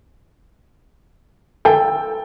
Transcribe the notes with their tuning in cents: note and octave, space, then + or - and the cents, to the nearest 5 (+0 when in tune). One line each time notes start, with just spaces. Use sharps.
A4 +0 G5 +15